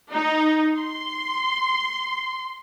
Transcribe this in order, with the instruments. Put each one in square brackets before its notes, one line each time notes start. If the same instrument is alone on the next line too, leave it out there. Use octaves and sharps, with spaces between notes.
[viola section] D#4
C6